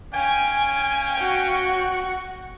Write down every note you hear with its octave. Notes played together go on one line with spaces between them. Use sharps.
C#4 F5 G5 G#5
F#4